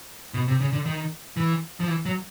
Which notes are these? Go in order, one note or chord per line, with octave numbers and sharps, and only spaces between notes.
B2
C3
C#3
D3
D#3
E3
F3
E3
F#3